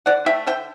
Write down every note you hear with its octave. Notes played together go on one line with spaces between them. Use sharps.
D3 D5 F#5
A3 E5 G5
D3 E5 G5